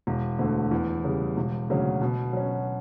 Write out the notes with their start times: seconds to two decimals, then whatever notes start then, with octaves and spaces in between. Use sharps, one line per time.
0.07 E1
0.39 D2 D3 A3
0.71 E2
1.04 C#3 G3
1.37 E1
1.69 D2 C#3 F#3 C#4
2.01 B2
2.33 F#3 C#4